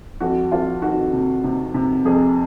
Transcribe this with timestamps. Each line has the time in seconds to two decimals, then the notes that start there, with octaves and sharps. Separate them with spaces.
0.20 F2 F#4
0.52 F2 F4
0.82 D#3 F#4
1.13 C3
1.44 C3
1.74 C3
2.05 F2 G#4